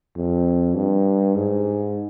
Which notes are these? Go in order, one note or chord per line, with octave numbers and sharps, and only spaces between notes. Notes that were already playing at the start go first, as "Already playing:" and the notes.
F2
G2
G#2